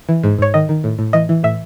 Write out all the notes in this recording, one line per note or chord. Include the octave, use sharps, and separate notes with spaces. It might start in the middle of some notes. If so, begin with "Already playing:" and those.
E3
G#2
G#2 C#5
D#3 D#5
D#3
A2
A2
E3 D#5
E3
A2 E5